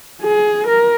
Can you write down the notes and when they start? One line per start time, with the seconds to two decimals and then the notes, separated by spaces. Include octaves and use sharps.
0.23 G#4
0.67 A#4